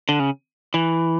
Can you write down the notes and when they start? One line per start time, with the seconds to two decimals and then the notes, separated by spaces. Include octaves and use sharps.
0.09 D3
0.20 C#3
0.74 E3